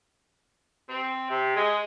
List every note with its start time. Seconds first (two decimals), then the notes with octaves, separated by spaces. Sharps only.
0.89 C4
1.30 C3
1.55 G#3